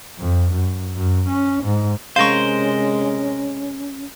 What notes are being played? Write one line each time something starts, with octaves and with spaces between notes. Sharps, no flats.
F2
F#2
F#2
C#4
G#2
C3 G#3 C#4 A#4 C5 F5 C#6